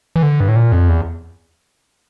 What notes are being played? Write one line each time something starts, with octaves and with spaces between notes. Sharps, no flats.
E3
D3
G2
A2
A#2
F2
E2